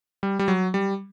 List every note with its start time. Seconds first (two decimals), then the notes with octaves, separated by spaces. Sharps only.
0.23 G3
0.39 G3
0.48 F#3
0.74 G3